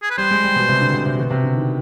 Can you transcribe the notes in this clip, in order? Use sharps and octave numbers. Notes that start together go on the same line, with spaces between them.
G#4
B4
G3 C5
G#3
G3
B2
C3
D3
C3
C3
B2
C3
D3
D#3